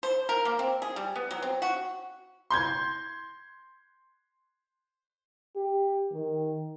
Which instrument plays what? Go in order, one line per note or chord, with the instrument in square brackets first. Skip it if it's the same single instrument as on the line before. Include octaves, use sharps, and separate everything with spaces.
[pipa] C5
A#4
A#3
C4
G#4
G3
B3
F#3
C4
F#4
[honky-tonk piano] C6 G6 G#6
[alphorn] G4
D#3